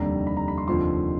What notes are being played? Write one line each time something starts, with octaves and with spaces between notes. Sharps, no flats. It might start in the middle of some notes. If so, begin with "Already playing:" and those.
Already playing: F1 D#2 D3 G3 A#5
B5
A#5
B5
C6
F1 D#2 D3 F3 C6